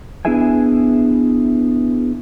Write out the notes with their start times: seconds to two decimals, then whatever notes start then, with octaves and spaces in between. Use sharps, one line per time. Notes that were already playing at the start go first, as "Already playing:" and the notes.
0.25 B3 D4 E4 G#4 E5 G#5